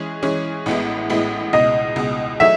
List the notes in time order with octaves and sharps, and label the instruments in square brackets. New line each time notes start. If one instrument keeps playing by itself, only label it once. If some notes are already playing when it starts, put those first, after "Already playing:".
Already playing: [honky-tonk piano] E3 G#3 C#4 G#4
E3 G#3 C#4 G#4
A1 A2 G#3 B3 E4
A1 A2 G#3 B3 E4
[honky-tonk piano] C#2 B2 G#3 [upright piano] D#5
[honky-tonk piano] C#2 B2 G#3
[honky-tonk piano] F#3 A3 D#4 G#4 [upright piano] E5